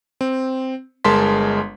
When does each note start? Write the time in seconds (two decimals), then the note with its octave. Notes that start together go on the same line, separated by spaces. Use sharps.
0.21 C4
1.04 G1 G#3 A#4 A5 C6 B6